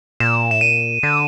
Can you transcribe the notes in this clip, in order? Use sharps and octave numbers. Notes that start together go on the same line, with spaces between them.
A#2 E7
A2 E7
A#2 D#7
D3